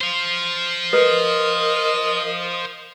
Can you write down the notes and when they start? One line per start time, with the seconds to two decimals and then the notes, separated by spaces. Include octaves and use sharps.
0.01 C5 F5
0.93 A#4 B4 D#5